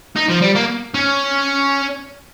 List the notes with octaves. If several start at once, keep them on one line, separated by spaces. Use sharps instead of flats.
D#4
F3
G3
A#3
C#4